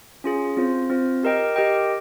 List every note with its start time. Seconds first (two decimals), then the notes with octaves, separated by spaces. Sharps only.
0.24 C#4 F4 G#4
0.57 C4 F4 C5
0.90 C4 F4 C5
1.23 G4 A#4 D#5 G5
1.56 G4 A#4 D#5 G5